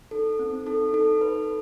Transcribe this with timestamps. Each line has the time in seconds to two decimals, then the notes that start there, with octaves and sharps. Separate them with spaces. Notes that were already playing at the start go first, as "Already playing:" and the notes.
0.11 D#4 A4
0.39 C4
0.66 D#4 A4
0.93 D#4 A4
1.21 A4 B4